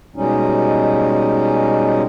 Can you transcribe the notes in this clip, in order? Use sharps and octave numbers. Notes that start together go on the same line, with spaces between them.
B2 G3 G#3 C#4 D#4